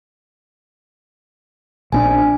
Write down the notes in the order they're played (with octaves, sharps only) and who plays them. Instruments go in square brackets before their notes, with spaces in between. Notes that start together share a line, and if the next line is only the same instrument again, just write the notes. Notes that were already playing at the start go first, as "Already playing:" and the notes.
[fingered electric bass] A#1 C4 D4 [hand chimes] G#5